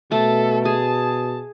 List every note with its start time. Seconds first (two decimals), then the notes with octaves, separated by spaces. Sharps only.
0.11 B2 A3 A4
0.65 G#4 A5